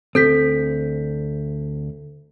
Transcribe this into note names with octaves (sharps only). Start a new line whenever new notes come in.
D2 C4 A4 G6 B6